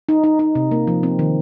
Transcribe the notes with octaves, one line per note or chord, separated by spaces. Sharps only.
D#4
D#4
D#4
C3
A#3
F3
C4
D#3